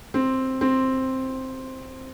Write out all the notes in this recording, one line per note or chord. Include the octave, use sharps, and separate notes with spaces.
C4
C4